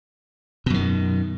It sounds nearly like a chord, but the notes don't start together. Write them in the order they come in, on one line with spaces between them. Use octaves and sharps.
B2 F#2 D#3